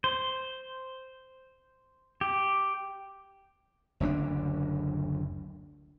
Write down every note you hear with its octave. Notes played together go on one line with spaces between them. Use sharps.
C5
G4
F#1 D2 C4 D4